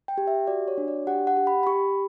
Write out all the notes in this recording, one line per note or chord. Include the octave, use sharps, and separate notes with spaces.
G5
G4
E5
F#4 D5
C#5
D4
D5
G4 F#5
F#5
G4
B5
B5
G4 C#6